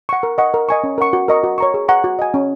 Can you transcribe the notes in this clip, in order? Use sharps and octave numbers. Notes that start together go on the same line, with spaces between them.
F#5 C#6
A#4
D#5 F#5 C#6
A#4
D#5 G#5 C#6
C#4
A#4 F#5 C#6
F#4
A#4 D#5 A#5 C#6
F#4
C#5 A#5 C#6
G#4
F#5 A#5 C#6
F#4
D#5 G#5
C#4